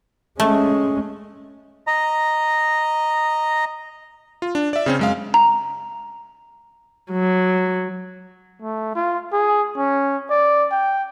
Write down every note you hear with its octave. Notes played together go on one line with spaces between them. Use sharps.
G#3 A3 C#4
D#5 A#5
F4
D4
D5 E5
C#3 C4 C#4
F#2 G#3 F5
A#5
F#3
A3
F4
G#4
C#4
D5
G5